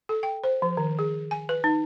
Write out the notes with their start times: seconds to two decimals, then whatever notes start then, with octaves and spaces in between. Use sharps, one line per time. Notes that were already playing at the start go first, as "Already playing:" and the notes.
0.09 A4
0.23 G5
0.44 C5
0.62 F3
0.77 D#3
0.99 G#4
1.31 G#5
1.49 B4
1.64 D#4